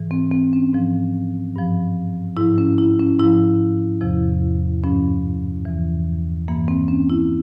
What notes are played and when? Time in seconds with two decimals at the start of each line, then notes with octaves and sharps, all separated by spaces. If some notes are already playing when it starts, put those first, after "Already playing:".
Already playing: G#2 E3
0.11 C4
0.32 C4
0.53 C#4
0.73 G#2 F3
1.56 G2 F3
2.37 G#2 F3 E4
2.58 C#4
2.78 E4
2.99 C#4
3.19 G#2 F3 E4
4.01 E2 C3 F3
4.83 G2 F3 C#4
5.65 E2 E3
6.48 G2 E3 A#3
6.68 C4
6.88 C#4
7.10 E4